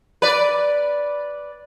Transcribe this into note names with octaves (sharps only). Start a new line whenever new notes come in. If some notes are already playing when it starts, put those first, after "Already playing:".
B4 D5